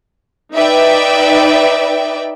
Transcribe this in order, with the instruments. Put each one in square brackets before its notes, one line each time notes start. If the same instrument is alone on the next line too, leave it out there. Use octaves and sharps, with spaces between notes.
[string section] D#4 B4 D5 E5 G5